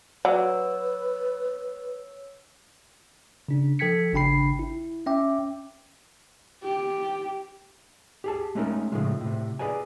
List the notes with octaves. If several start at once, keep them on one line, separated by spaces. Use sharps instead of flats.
F#3 B4 C#5 D5 E6
C#3 D4
F3 A4 G5 G#6 B6 C#7
G#1 C#3 D4 G5 B5 C7
E4
C#4 E5 G5 D6
G4
G4 G#4 A5
G#3 A3 C#4 D#4 A#4
A2 C#3 E3 F3 G#3
A2 C3
G#4 B4 D5 D#5 G#5